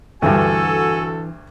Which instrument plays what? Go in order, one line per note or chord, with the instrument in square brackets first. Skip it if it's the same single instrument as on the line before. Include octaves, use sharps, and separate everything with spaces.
[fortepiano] D2 G2 [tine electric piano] E3 D4 [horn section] F#4 A4 [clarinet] G#5